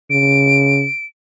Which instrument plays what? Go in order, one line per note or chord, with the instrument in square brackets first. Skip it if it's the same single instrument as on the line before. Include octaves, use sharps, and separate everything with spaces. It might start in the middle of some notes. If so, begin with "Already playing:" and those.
[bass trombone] C#3 [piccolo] D7